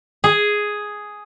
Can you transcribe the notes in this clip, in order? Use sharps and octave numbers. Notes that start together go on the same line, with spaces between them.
G#4